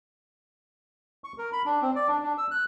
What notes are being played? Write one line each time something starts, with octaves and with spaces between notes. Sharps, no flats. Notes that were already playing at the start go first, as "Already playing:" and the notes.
C#6
A#4
B5
D4
C4
D5
D4
D4
E6
F#6